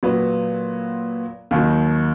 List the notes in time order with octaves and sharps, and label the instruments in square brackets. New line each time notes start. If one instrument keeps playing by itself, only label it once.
[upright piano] A#2 F#3 B3
D#2 D#3 F#3